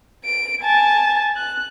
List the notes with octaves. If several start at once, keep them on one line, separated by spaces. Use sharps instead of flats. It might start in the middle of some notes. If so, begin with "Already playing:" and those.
D7
G#5 A5
F#6